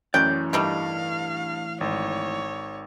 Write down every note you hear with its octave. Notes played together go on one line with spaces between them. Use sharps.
F#2 A2 E3 C#4 D5 G5 F#6
G2 D#3 G3 A3 F5
G#1 C#5